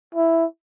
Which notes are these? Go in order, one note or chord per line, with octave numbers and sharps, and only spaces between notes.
E4